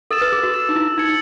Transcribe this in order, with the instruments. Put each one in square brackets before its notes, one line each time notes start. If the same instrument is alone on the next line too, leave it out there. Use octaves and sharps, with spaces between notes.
[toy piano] A4 [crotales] E6 A6 E7
[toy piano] B4
G#4
F#4
[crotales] E6 A6 E7
[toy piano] D#4
E4
[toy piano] D#4 [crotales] G#6 C#7 F#7